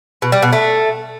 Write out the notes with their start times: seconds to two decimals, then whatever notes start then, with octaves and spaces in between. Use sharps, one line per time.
0.22 B2
0.32 G3
0.42 B2
0.53 A3